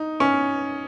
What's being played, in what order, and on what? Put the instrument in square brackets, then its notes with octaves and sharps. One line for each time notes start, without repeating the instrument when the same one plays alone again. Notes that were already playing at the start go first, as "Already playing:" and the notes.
Already playing: [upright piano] D#4
C#4